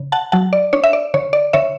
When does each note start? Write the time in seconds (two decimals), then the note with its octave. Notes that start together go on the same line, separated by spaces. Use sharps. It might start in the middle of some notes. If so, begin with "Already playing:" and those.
Already playing: C#3
0.12 F#5 A5
0.32 F#3 F#5 A5
0.53 D5
0.73 D4 C#5
0.84 E5
0.93 D5
1.14 D3 C#5
1.33 D5
1.53 D3 C#5 E5